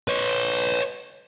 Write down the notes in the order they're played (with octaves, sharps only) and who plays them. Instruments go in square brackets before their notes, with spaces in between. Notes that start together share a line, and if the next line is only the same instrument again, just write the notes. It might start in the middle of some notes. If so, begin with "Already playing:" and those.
[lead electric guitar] B4 C#5